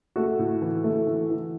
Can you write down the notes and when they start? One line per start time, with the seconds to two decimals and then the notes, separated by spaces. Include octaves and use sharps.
0.16 A3 F#4
0.39 A2
0.62 E3
0.84 A3
1.07 E3
1.30 E3